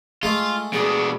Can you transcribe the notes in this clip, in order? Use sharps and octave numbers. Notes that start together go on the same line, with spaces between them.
G#3 A3 F4
B2 D4 G#4